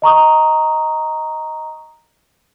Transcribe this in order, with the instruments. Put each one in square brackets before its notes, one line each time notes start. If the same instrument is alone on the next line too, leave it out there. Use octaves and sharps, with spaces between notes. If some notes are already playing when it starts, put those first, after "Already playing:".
[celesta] D#5 A#5 C#6 D#6